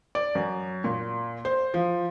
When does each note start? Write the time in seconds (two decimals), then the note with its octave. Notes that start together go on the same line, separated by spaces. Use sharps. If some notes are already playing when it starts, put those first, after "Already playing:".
0.15 D5
0.35 F#2
0.84 A#2
1.45 C5
1.74 F3